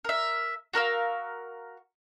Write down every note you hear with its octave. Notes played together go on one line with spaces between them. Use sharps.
A#4 E5
F#4 A#4 F5 E6